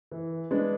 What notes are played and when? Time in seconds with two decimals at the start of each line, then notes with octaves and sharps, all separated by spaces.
0.11 E3
0.51 G#3 B3 D4